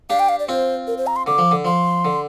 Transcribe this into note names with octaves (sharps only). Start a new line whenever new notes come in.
D4 G4 F5
G5
F5
D5
C4 F4 C5
A#4
C5
A#5
C6
D3 D6
F3
D3
F3 C6
D3